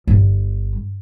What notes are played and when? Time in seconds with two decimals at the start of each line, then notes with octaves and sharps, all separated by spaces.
0.07 G1